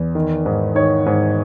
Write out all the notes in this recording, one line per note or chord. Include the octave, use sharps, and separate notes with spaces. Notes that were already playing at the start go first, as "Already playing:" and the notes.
Already playing: E2
D#3
G#2
D#3 C#5
G#2